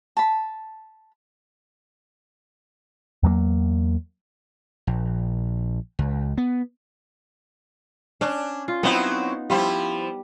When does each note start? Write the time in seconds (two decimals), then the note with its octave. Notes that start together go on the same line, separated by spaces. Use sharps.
0.17 A5 B5
3.23 E2 F#3 G3 A#3
4.87 A#1
5.99 C#2
6.38 B3
8.21 C#4 D4
8.68 F4
8.83 F#3 B3 C4 D#4 E4
9.50 F3 G3 E4 F4